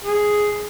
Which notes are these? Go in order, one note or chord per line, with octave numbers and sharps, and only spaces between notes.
G#4